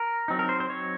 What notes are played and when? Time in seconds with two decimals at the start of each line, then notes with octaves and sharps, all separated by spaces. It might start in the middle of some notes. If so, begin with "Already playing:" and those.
Already playing: A#4
0.28 F#3 C4 D#4
0.39 A#4
0.49 C5
0.60 C5
0.70 C#5